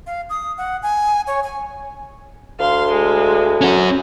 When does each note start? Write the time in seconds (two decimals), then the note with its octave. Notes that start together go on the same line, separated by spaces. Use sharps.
0.07 F5
0.30 D#6
0.58 F#5
0.83 G#5
1.27 C#5
1.44 G#5
2.60 D2 F5 C6
2.92 G#3
3.61 C#4 F#4